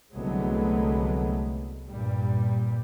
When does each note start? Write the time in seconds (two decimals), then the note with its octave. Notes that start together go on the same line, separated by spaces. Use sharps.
0.15 C2 D3 F#3 G#3 A3 B3
1.88 G2 A#2 G3